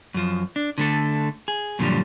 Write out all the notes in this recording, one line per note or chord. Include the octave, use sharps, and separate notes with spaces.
F#2 F3
D4
D3 A3 A4
G#4
F#2 A#2 D3 F3 G3